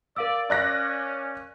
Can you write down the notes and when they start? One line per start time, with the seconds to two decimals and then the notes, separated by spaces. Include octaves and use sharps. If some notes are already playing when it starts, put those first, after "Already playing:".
0.16 A#4 D5 F5 E6
0.50 C#4 D5 F#6 A#6